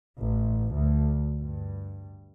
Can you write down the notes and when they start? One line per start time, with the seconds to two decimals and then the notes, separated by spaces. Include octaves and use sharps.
0.21 A1
0.75 D2
1.39 G2